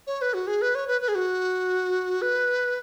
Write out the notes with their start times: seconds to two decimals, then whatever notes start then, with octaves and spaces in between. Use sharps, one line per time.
0.07 C#5
0.22 B4
0.34 F#4
0.47 G#4
0.62 B4
0.75 C#5
0.88 B4
1.01 B4
1.08 G#4
1.15 F#4
2.22 B4